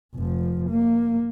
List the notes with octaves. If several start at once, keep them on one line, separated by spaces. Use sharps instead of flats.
F1 F3
A#3